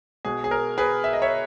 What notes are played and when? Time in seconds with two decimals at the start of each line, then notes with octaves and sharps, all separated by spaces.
0.25 B2 G#3 G#4
0.44 G#4
0.51 A#4
0.78 G#4 B4
1.04 E5
1.13 D#5
1.22 C#5 E5